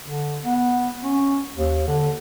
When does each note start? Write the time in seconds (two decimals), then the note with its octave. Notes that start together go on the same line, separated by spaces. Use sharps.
0.03 D3
0.44 B3
1.04 C#4
1.56 D#2
1.87 D3